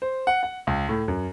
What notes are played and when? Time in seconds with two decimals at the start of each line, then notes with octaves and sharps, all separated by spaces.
0.02 C5
0.27 F#5
0.43 F#5
0.67 C#2
0.89 A2
1.08 F#2